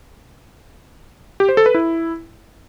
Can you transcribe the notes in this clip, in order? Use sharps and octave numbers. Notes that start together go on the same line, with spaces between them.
G4
C5
A4
B4
E4